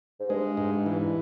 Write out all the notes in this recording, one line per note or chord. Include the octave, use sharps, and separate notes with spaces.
G#2
G2 G#3
G#2
E3